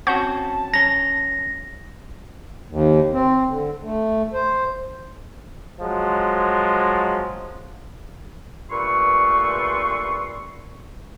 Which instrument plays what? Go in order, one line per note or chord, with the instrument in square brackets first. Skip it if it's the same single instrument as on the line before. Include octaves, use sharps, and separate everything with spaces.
[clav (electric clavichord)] C4 C#4 F#4 [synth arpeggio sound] F#5 C#6 G6 [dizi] A5
[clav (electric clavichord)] C#4 A#5 [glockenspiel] A#6
[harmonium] D#2
C4
D3
A3
C5
[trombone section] F3 F#3 G#3
[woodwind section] G2 A#2 A3 B4 C6 C#6